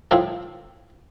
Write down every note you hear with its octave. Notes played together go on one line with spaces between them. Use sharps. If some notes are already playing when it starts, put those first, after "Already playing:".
A2 F3 A3 C4 E4 G5